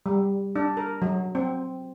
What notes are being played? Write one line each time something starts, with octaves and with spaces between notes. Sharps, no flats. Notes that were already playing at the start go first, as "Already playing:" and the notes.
G3
D4
A#4
F#3
C4